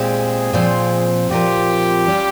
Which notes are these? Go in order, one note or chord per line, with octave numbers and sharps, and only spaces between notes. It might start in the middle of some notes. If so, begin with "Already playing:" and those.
Already playing: A#2 G#3 C4 G4 G#4
A#2 F3 C4
A#2 F3 C4 F4 G4 A#4
G3 C#4 F4